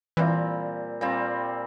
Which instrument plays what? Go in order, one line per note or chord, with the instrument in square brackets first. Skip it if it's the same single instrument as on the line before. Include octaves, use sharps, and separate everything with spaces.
[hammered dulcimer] A#2 G3 C4 [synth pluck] E3
[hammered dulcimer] A#2 G3 C4